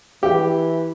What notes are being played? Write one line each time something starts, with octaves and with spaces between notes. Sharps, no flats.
E3 G4